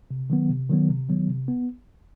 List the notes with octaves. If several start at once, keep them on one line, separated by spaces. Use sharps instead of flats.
C3
D#3 F#3 B3
C3
D#3 F#3 B3
C3
D#3 F#3 B3
C3
B3